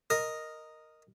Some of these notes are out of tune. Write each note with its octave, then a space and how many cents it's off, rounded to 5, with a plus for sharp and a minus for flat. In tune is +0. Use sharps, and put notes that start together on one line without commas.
A#4 +0 D#5 +0